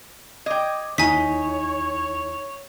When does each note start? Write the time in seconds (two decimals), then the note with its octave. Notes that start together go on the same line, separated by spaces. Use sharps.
0.46 D#5 G5 D6 G#6
0.98 D#2 D#4 E4 C#5 G#5 B6